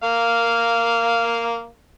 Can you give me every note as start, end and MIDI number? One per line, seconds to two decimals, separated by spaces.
0.03 1.68 58
0.03 1.68 77